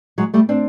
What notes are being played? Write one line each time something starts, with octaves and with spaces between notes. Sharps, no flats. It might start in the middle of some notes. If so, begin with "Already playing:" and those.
F#3 G#3
G3 A3
C4 D4